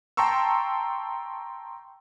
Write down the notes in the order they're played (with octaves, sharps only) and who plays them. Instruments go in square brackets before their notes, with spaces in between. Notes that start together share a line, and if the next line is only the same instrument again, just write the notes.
[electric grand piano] G5 A5 A#5 C6 C#6 E6